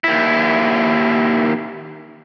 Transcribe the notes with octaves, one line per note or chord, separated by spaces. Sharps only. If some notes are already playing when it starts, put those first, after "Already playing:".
D#2 E4